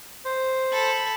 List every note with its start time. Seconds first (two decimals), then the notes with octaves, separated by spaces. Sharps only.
0.25 C5
0.72 A4 B5